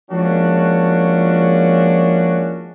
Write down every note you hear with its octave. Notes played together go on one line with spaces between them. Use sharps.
F3 G#3 A#3 C#4 D4 F#4